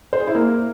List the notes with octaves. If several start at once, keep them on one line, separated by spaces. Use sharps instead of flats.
C5
G#4
E4
A#3